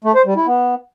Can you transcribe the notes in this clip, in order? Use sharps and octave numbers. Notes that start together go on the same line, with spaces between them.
A3
C5
G3
E4
B3